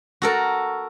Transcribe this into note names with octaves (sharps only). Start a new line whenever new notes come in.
F#4 A4 A#4